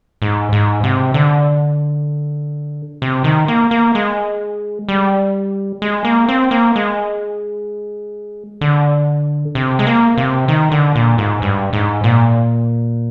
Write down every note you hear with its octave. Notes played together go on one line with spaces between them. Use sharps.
G#2
G#2
C3
D3
C3
D#3
A#3
A#3
G#3
G3
G#3
A#3
C4
A#3
G#3
D3
C3
G#3
A#3
C3
D#3
D3
A#2
G#2
G2
G#2
A#2